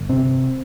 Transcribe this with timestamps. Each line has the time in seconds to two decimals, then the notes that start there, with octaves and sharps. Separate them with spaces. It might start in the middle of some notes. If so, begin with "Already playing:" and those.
Already playing: G1
0.09 C3 C4